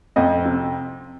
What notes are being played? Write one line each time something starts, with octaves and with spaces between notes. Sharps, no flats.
F2 D#5
C3